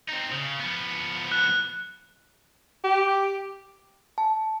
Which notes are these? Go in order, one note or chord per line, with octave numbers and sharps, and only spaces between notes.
C4 D#4
C#3
F3 B3
F#6
G4
A5